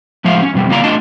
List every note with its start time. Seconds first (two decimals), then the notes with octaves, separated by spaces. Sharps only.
0.24 A2 F3 G#3 E5 F5
0.42 C#4
0.54 F2 B2 G3
0.69 C#3 A#3 E4 D5 F5 A#5
0.83 A3 D4 F4 D#5 A5